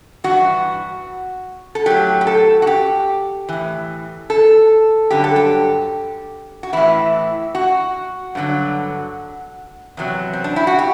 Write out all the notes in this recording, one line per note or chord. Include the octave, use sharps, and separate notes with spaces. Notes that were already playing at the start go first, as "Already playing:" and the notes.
G2 E3 F#4
A4
A2 F#3 G4
G4
A4
F#4
G4
A2 E3
A4
G2 D3 F#3 G4
A4
G4
F#4
A2 E3 E4
F#4
G2 D3 F#3
E2 C3 F#3
C4
D4
E4
F#4
G4